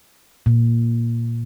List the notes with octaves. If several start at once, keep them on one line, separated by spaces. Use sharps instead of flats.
A#2